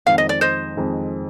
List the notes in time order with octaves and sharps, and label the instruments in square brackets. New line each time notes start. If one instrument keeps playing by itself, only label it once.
[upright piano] F2 D#3 G#3 C4 [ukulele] F5
[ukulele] D#5
D5
C5 D#5
[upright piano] F2 D#3 G#3 C4